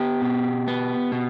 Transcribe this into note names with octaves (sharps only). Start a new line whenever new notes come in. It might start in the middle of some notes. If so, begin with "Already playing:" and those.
Already playing: B3 G4
B2
B3
B2